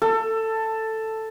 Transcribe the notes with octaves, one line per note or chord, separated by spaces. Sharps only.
A4